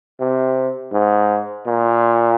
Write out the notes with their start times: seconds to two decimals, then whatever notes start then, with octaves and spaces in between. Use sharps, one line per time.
0.20 C3
0.93 G#2
1.67 A#2